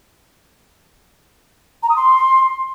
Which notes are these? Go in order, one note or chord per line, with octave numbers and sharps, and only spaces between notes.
A#5
D#6
C6